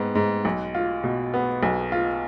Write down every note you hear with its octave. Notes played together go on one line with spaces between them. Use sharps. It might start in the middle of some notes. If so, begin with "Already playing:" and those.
Already playing: G#2 B3
G#2
B1
F4
B2
B3
B1
F4